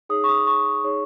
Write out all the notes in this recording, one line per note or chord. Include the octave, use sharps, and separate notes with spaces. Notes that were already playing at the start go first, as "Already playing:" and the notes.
D#4 G#4 C#5 D#6
C#6
D#6
C#6
D#4 G#4 C#5